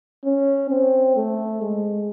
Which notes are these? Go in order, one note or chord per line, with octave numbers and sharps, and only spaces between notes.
C#4
C4
A3
G#3